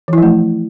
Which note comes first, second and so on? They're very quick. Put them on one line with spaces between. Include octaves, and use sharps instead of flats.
E3 E4 F3 A3